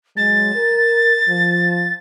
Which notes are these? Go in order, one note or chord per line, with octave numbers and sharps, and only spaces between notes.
F#3 G#3 A6
A#4
F3